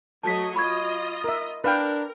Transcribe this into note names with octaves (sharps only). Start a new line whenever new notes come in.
F#3 A3 D#5 A5 B6
F4 D#5 B5 C#6 G#6
A#4 E5
D4 A#4 B4 F5 G5